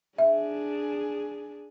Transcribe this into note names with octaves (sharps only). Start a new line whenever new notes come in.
D4 G#4 E5